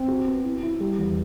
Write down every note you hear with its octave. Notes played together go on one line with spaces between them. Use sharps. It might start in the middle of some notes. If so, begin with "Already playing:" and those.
Already playing: C4
F#4
B3
E4
E4
G3
E2